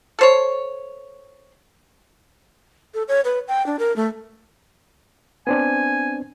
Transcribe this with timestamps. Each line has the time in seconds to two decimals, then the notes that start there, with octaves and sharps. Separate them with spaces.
0.19 A4 C5 C#5
2.94 A4
3.08 C#5
3.25 B4
3.48 G5
3.66 D4
3.79 A#4
3.96 A3
5.47 B3 C4 D4 G#5